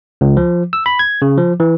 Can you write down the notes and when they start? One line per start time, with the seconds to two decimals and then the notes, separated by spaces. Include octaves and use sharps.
0.21 C#2
0.37 F3
0.73 E6
0.86 B5
0.99 G#6
1.22 C#3
1.38 F3
1.60 E3